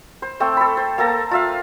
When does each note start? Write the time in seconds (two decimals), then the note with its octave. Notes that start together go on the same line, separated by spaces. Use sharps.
0.22 C5
0.40 A3 C4 G5
0.57 A4 B5
0.77 C5
0.98 A#3 A4 A5 A#5
1.31 F4 E5 F5